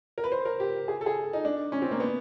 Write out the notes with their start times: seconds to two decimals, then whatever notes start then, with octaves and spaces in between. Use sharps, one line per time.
0.18 A#4
0.24 B4
0.32 C5
0.45 A#4
0.60 G4
0.88 G#4
1.01 A4
1.06 G#4
1.33 D#4
1.45 D4
1.72 C#4
1.82 C4
1.91 A#3
2.00 B3